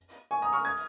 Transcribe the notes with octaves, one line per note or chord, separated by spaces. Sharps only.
G#5 C#6
A#5 D#6
C#6 F6
D#6 G#6